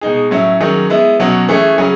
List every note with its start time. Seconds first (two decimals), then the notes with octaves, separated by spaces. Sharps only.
0.01 B2 G#3 D#4 G#4
0.31 A2 F#3 C#4 E4
0.60 D#3 F#3 C#4 G#4
0.90 G#3 B3 E4
1.19 B2 F#3 C#4 F#4
1.49 E3 A3 C#4 G#4
1.78 C#3 F#3 C#4 G#4